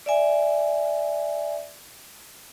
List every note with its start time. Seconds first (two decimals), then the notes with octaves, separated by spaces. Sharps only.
0.06 D5 E5 G#5